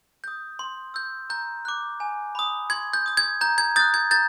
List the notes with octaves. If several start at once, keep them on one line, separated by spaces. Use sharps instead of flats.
D#6 G6
C6
E6 G6
A#5 G6
D6 F#6
G#5
B5 D#6
C6 G#6
G6
D#6 G6
G#6
A#5 G6
G#6
D#6 F#6 G6 A6
G#6
A#5 G6 A6